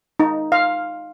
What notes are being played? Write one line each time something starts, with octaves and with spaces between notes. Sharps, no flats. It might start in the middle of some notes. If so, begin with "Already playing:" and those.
D#4
F5